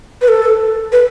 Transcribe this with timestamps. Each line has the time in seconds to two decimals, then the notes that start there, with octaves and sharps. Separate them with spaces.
0.22 B4
0.28 A4
0.92 B4